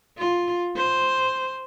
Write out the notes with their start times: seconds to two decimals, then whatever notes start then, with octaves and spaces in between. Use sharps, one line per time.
0.18 F4
0.76 C5